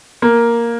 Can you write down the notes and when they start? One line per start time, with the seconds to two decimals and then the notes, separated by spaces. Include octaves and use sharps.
0.22 A#3